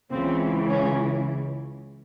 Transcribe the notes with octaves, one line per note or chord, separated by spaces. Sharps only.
C#2 C#3 E3 C4
C#4